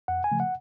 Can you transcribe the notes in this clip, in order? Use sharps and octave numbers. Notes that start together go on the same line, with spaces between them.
F2 F#5
G#5
C#3 F3 A3
F#5